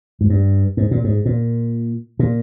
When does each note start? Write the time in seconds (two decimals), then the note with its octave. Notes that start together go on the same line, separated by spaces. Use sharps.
0.21 G#2
0.30 G2
0.77 G#2
0.91 A#2
1.04 G#2
1.25 A#2
2.19 A#2